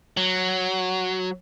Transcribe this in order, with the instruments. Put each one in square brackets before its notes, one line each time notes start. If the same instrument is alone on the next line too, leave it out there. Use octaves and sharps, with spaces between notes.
[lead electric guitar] F#3